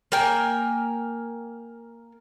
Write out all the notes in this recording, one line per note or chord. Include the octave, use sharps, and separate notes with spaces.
A#3 A#4 G5 G#5